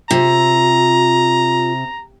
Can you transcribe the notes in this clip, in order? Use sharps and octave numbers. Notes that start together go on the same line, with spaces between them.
C3 F4 A#5